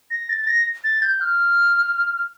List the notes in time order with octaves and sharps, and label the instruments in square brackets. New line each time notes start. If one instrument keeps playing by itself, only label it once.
[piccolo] A#6
A6
A6
A#6
A6
G6
F6